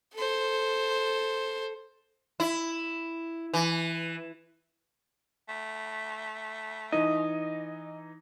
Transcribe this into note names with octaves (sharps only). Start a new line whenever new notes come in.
A4 C5
E4
E3
A3
E3 D#4 D#5